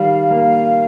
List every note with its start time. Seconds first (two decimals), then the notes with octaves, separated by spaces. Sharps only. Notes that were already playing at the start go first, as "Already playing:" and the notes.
Already playing: D#3 G3 F5
0.31 A#3